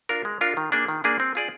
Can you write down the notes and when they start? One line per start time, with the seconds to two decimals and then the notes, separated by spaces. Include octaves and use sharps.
0.09 D4 F4 A#4
0.25 G#3
0.41 D4 F4 A#4
0.57 D#3
0.72 A#3 D4 G#4 D5
0.88 D#3
1.04 A#3 D4 G#4 D5
1.20 C4
1.35 F4 G#4 D5